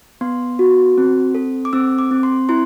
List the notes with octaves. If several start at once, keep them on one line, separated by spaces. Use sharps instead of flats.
B3 C6
F#4
C4
A4
D6
C4 E6
D6
C4
C6
E4 C6